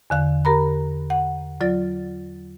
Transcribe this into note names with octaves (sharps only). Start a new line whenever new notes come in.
E2 D3 F5
G4 A#4 A#5 B5
F#5
F#3 F4 D5 A6